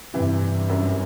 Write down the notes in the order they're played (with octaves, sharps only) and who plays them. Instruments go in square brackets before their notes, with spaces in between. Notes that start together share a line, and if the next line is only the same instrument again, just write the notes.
[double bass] G2 [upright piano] C3 E3
[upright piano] F#2